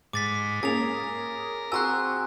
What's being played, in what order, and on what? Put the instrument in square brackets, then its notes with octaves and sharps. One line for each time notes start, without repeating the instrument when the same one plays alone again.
[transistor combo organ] G#2 [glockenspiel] D6 A6 B6
[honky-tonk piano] A#3 C#4 [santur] G#4 [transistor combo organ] A#4 [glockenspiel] A6 F7
[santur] C4 F#4 G#4 [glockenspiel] G#5 A#5 F#6 [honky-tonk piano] E6